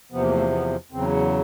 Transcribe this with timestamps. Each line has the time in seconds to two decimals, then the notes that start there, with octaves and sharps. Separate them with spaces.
0.12 E2 C3 F3 B3
0.21 A#3
0.31 A3
0.41 A#3
0.51 B3
0.92 E2 C#3 F#3 C4